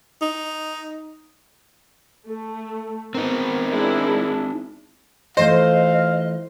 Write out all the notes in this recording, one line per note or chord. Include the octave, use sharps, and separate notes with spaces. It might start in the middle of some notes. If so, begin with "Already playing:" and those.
D#4
A3 A4
B3 C4 D#4 A#4
G#3 D4 E4
E3 A3 F4 C5 D#5 F5